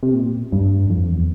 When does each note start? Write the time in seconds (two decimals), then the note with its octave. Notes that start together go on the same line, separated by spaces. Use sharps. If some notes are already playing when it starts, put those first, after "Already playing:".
0.03 C3
0.14 A#2
0.52 G2
0.90 F2
1.09 E2